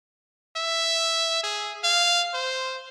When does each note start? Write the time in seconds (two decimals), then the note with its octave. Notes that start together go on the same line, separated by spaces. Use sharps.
0.56 E5
1.44 G#4
1.84 F5
2.34 C5